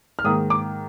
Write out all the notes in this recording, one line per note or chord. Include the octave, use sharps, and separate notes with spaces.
F6
G#2 D#3 A#3 D#6
D6